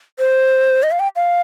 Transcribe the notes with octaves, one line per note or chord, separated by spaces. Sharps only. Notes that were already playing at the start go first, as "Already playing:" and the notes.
C5
D#5
F5
G5
F5